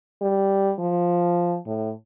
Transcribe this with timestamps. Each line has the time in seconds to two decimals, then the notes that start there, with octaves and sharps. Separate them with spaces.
0.22 G3
0.79 F3
1.66 A2